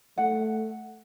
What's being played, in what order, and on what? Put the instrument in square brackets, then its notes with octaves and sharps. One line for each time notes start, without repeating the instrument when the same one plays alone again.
[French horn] A3 [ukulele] F#5